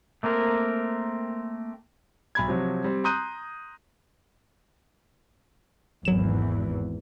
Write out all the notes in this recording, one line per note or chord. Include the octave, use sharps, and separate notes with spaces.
A3 A#3 C4 A#4
B1 B5 G#6
C3 F3 F#3
G3 C4
A#5 C6 D#6 F#6 G6 D#7
G#1 E2 E3 F#3 E7